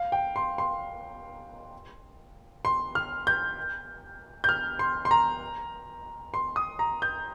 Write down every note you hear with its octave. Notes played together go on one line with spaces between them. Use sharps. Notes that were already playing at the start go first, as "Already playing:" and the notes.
Already playing: F5
G5
C6
C6
C6
F6
G6
G6
F6
C6
C6
A#5
C6
D#6
A#5
G6